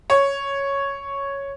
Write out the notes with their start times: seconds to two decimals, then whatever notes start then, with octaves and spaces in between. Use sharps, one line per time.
0.10 C#5